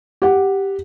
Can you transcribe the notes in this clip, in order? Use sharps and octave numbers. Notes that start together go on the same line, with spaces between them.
G4 F#5